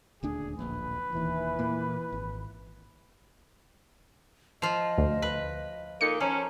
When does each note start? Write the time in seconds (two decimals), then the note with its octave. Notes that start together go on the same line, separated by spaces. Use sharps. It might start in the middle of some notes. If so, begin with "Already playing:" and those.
0.23 D#1 D2 D4 G#4
0.59 D1 A#1 B4
1.13 E1 D#2 E3
1.59 A#2 A#3
2.12 G#1
4.62 F3 F4 D#5
4.98 D2
5.22 B4
6.01 A#2 A#3 D#4 A4 C#7
6.20 F3 C#4 A#5